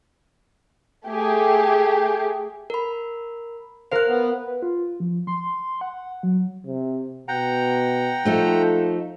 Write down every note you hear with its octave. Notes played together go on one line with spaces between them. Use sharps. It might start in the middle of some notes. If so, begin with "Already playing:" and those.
A3 G4 G#4
A#4 B5
A#4 C5 F5 F#6
B3
B4
F4
F3
C6
F#5
F#3
C3
B2 F#5 G5 A#5
F3 A3 D#4 A4